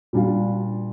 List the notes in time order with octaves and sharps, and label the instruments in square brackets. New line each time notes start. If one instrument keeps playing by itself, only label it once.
[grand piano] A#2 G3 D4 F4